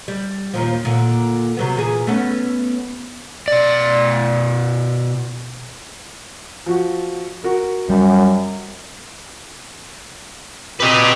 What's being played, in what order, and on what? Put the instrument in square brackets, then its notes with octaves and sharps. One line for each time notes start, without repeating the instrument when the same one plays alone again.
[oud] G3
D#2 A#2 F3
D#2 A#2 D3
C3 F#3 B3
A#2 E3 G#4
A3 B3 C#4
[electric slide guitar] B2 D5
[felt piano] F3 F#4
F#4 A#4
[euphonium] F#2 [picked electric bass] G3
[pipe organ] A#2 C4 G4 [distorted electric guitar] B4 D#5